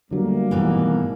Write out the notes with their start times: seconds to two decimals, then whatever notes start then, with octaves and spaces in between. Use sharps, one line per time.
0.11 D3 F#3 G3 A3 A#3 D4
0.51 G#1 G#2 B2 E3